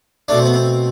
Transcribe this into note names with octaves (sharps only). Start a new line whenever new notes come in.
B2 A3 D4
C4
B3
C4